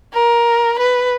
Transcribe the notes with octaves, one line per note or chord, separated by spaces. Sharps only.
A#4
B4